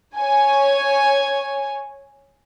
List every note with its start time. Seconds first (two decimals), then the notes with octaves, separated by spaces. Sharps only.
0.17 C#5 G#5